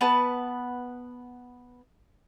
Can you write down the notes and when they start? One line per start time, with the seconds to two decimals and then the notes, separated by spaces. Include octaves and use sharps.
0.01 B3 B4 A5